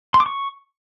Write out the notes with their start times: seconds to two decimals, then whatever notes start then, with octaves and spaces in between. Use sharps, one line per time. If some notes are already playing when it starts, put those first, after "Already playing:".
0.14 C6
0.20 D6
0.26 C#6